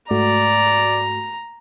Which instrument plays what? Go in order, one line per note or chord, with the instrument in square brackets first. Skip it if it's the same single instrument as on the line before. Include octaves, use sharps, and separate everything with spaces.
[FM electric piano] G#2 A3 F#4 [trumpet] D5 [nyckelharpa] A#5